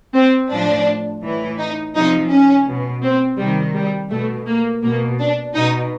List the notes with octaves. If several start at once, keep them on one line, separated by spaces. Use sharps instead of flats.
C4
A2 F3 D4
A2 E3
D#4
C3 F3 D#4
C#4
B2
C4
C3 D#3 G3
G3
B2 A3
A#3
B2 A#3
D4
B2 D#4